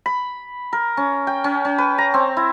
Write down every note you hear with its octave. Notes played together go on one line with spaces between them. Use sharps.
B5
A#4
C#4
G5
C#4
C#4
B4
A#5
C4
E4